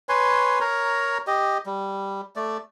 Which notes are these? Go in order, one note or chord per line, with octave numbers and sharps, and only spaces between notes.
B4 C#5 G#5 C6
A#4 C#5 A#5
G4 D#5
G3
A3 D5